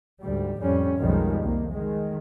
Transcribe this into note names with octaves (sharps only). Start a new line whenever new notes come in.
D2 G#2 G3
F2 A2 G3 C#4
B1 F2 D#3 F3 G3 G#3
C2 D#3 A#3
D#3 G#3